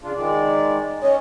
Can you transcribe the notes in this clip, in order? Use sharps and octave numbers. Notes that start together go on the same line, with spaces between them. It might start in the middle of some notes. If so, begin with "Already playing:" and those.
C#3 D4 F4
D#3 G#3 D5
C#4 C#5 D#5